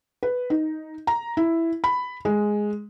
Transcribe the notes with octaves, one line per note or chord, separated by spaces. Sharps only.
B4
D#4
A#5
E4
B5
G#3